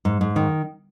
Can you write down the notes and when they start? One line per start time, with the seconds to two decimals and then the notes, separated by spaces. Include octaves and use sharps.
0.05 G#2
0.21 G#2
0.36 D#3